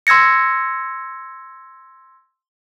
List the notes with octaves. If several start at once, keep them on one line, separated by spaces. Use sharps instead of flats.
C6 E6 G#6 A#6 C#7